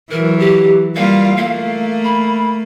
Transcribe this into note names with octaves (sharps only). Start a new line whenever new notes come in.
E3 F#3 A#4
G4
G3 A#3 F4 F5
A3 A#3 F5
B5